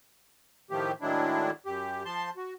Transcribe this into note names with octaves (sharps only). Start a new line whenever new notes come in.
A2 D#3 F3 A3 G4
A2 D#3 F#3 G#3 D4 E4
F#2 G4
F3 A5 C6
F#4